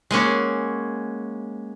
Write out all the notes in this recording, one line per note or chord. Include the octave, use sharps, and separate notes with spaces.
G#3 A#3 C#4 F#4